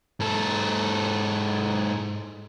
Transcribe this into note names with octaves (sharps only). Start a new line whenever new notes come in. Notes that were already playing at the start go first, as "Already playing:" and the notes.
G#2 A4